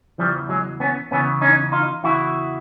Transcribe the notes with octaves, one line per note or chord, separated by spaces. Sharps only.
E2 C#3 E3 F3 G3
F#3 G#3
B3 C#4
E2 C#3 E3 B3 C#4
C#4 D#4
D#4 F4
E2 C#3 E3 E4 F#4